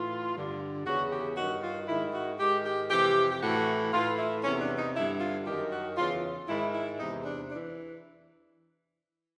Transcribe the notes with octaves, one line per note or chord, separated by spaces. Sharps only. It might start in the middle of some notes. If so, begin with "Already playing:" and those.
Already playing: A2 E3 F4
G2 D3
E2 C#3 E3 F#4
G4
G2 D#3 F#4
F4
G#2 D#3 E4
F#4
G#2 D#3 G4
G4
F2 C3 E3 G4
G4
A2 E3 F#4
A2 E3 F4
E4
E2 C3 E3 C#4
D4
D#4
G2 D3 E4
F4
F#2 D#3 G4
F#4
E2 C#3 E3 F4
G#2 D#3 E4
E4
E2 C3 E3 D#4
D4
E3 D4